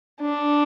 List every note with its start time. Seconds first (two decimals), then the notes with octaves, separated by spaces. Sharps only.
0.21 D4